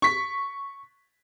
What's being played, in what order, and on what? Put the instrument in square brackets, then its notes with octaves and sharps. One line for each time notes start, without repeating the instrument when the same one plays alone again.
[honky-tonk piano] C#6 B6